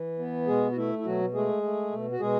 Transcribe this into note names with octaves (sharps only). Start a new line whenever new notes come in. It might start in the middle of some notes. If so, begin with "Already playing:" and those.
Already playing: E3
B3
B2 G#3 G#4
F#4
A3 E4
E4
B2 F#3 F#4
G#3 A3 G#4
A3
B2
F#4
B2 G#3 G#4